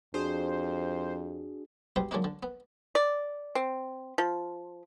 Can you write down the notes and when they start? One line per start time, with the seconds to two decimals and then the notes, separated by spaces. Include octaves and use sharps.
0.14 F2 D4 F#4 G#4 C5
1.96 G#2 B2 G3 G5 C6
2.11 D3 F#3 G#3 A#3 D4 D#4
2.24 D3
2.43 B3
2.95 D5
3.55 C4
4.18 F3